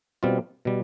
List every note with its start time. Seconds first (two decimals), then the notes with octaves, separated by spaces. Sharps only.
0.23 B2 G3 C4 F4
0.65 B2 G3